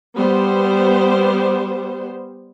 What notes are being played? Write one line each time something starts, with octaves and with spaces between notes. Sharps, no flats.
G3 B3 C5